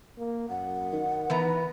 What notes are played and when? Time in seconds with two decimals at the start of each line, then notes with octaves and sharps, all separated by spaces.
0.18 A#3
0.49 F#2 F#5
0.93 D#3
1.30 E3 B3 B4 A#5